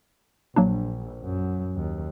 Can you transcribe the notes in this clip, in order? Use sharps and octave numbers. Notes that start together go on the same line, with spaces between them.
A#1 F#3 A#3 D4
F#2
D#2